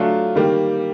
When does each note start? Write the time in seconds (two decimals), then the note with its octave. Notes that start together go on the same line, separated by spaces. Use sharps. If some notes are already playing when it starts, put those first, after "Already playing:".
Already playing: F#3 A3 D4 F4
0.35 D#3 G3 A#3